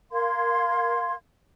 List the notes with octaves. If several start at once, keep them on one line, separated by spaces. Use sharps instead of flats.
A#4 F5 C6 G#6